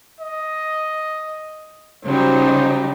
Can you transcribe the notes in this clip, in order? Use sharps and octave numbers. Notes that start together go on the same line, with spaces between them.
D#5
C#3 F#3 G3 D#4 C5